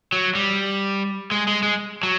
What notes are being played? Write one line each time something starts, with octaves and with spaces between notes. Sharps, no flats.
F#3
G3
G#3
G#3
G#3
F#3